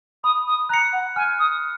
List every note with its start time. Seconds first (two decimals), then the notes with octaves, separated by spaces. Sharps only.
0.24 B5 D#6
0.47 D#6
0.69 A#5 F#6
0.74 C#7
0.93 F#5
1.16 G#5 F6
1.39 D#6